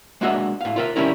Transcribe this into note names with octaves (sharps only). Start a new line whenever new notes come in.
G#3 A#3 D4 F#4 D#5 E5
A2 F5
F4 A#4 E5
D#3 G3 A3 C#4 E4 A#4